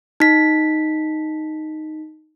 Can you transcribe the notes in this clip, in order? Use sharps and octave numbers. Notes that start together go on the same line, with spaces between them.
D#4 B6